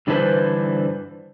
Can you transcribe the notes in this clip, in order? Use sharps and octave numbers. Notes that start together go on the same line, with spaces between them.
G2 D3 E3 D4 B4 C5